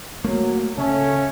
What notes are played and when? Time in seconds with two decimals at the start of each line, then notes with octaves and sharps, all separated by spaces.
0.24 F#3 A3 A#3
0.78 C#3 C#4 A4 C#5 E5